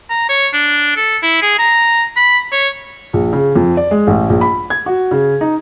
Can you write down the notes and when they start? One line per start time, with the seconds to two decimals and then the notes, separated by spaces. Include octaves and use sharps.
0.10 A#5
0.29 C#5
0.53 D4
0.96 A4
1.22 E4
1.42 G#4
1.59 A#5
2.16 B5
2.52 C#5
3.13 A#1
3.33 C#3
3.56 F2
3.77 D5
3.91 G#3
4.07 A1
4.30 A#1
4.41 B5
4.70 G#6
4.86 F#4
5.11 C#3
5.41 D#4